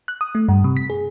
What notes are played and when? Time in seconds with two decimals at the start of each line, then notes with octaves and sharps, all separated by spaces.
0.08 F#6
0.21 D#6
0.35 A3
0.49 G2
0.64 C3
0.77 B6
0.90 G#4